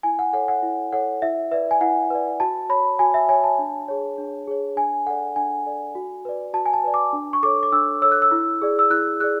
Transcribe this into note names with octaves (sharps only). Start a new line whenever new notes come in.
E4 G#5
F#5
A4 C#5 F#5
F#5
E4
A4 C#5 F#5
E4 E5
B4 D5 E5
G#5
E4 F#5
B4 D5
F#4 A5
C#5 B5
F#4 G#5
E5
C#5 G#5
A5
D4
G#4 C#5
D4
G#4 C#5
D4 G#5
A4 D5 F#5
D4 G#5
A4 D5
F#4
B4 D5
F#4 A5
G#5
A5
B4 D5
D6
D4
C#6
A4 C#5 D6
D6
D4 E6
A4 C#5 E6
F#6
E6
E4
G#4 D5
E6
E4 F#6
G#4 D5 F#6